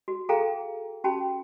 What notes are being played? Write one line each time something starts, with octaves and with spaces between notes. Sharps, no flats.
F#4
G#4 A4 F5 G5 A#5
C#4 F#4 G4 G5 A5 B5